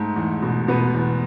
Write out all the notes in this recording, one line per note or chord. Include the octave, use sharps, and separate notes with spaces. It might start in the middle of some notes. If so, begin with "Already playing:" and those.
Already playing: G#2 A3 A4
E2
B2
B2 B3 B4
E2